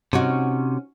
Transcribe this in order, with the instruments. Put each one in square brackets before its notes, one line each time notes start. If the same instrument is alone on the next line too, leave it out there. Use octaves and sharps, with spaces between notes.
[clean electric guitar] C3 [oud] C#4 D#4 F#4